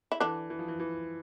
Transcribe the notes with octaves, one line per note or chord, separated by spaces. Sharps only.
E4
D3 E3 D4
E3
F3
E3
E3